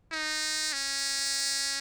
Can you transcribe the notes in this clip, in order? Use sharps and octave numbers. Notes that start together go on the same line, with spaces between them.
D#4
C#4